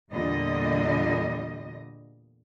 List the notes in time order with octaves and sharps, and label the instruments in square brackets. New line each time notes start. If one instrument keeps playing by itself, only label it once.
[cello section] E2 A#2 D3 G3 D#5